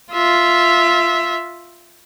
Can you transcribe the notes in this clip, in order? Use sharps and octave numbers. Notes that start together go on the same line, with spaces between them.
F4 E5